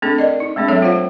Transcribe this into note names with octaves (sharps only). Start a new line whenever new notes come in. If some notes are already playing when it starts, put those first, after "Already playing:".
A3 C4 D4 G#4 A4
A#4 D5 D#5
D#4
G#3 A3 C4 D4 G#4
F#3 C4 G#4 A4 C#5 E5
A3 F4 C5 C#5 F5 F#5